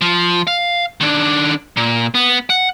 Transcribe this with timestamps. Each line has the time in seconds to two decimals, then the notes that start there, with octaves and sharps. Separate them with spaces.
0.01 F3
0.47 F5
1.01 D#3 D4
1.77 A#2
2.14 B3
2.50 F#5